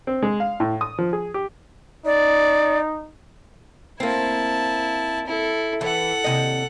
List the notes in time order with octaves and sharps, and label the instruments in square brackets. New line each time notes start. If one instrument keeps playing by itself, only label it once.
[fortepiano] C4
G#3
F5
A2
D#6
F3
G#4
G4
[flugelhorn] D#4 [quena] D5
[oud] A#3 C4 [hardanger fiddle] E4 A5
[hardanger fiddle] E4 A4
[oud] E3 [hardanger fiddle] A4 F#5
[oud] D#2 C3 D#5